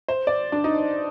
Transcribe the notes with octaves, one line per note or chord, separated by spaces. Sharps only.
C5
D5
D4
D#4